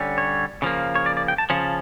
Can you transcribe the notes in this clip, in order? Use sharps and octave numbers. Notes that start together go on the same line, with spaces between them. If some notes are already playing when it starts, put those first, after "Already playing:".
Already playing: D3 G3 C#4
C#5
C#3 F3 A#3
C#5
D5
D5
G5
A5
C#3 F3 C#4 A5